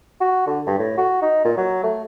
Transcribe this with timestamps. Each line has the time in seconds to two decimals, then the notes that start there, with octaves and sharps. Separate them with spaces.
0.20 F#4
0.47 D3
0.67 G2
0.78 A2
0.97 F#4
1.22 D#4
1.45 A#2
1.57 F#3
1.83 A3